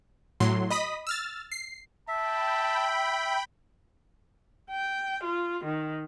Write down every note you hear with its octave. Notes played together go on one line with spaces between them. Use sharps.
A2 F#3 C6
D#5 B5 D#6 B6
E6 F6 A6
C7
E5 G5 A5 B5
G5
F4
D#3